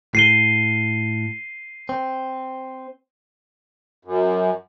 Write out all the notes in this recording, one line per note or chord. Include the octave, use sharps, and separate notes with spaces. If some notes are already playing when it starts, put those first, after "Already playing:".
A2 C7 D#7 G7
C4
F#2